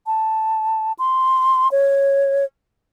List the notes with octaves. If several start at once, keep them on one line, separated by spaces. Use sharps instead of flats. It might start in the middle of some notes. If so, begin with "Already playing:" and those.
A5
C6
C#5